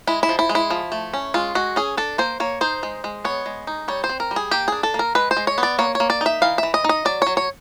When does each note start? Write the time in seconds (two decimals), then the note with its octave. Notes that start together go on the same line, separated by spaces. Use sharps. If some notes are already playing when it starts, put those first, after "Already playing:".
0.07 G#3 E4
0.23 E4
0.29 F3
0.39 E4
0.49 G#3
0.55 E4
0.70 F3
0.92 A3
1.14 C#4
1.34 G#3 F4
1.55 G#3 F#4
1.76 C#4 G#4
1.97 D4 A4
2.18 A#3 C5
2.40 A#3 C#5
2.61 D#4 C5
2.83 G#3
3.04 G#3
3.25 B3 C#5
3.46 G#3
3.67 D#4
3.88 G3 C#5
4.04 C5
4.09 C4
4.20 A#4
4.31 G3
4.36 G#4
4.51 A#3 G4
4.68 D4 G#4
4.83 A4
4.94 A#3
4.99 A#4
5.15 G#3 B4
5.31 C5
5.37 G#3
5.47 C#5
5.58 B3
5.63 D5
5.79 A#3 C#5
5.95 C#5
6.00 A#3
6.10 D5
6.21 D#4 E5
6.42 E3 F5
6.58 E3 E5
6.74 D#5
6.84 D#4 D#5
7.05 F#3 D5
7.22 F#3 C#5
7.37 C#5